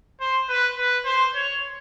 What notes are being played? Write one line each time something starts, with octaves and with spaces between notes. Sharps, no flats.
C5
B4
B4
C5
C#5